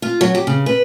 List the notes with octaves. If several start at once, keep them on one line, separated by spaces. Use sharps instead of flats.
F4
F#3
G4
C#3
B4